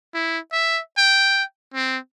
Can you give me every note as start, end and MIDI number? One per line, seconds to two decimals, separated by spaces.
0.14 0.38 64
0.52 0.80 76
0.98 1.43 79
1.74 1.97 60